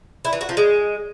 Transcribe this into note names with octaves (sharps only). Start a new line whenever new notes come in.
E4
E3
F#4
F3
G#3